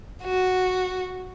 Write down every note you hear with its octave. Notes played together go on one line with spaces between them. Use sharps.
F#4